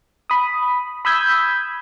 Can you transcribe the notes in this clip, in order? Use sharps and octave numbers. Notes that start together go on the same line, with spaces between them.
B5 D#6
B5 D#6 E6 G6 G#6 B6